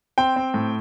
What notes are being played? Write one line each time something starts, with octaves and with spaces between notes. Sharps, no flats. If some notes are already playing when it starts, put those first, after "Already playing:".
C4 G5
C4
A2